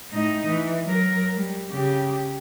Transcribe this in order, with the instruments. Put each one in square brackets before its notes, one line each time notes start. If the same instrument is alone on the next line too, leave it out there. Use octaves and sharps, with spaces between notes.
[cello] A2 D#4
E3
F#3 A#4
G3
C#3 G4